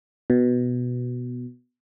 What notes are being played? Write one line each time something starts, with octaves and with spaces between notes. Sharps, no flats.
B2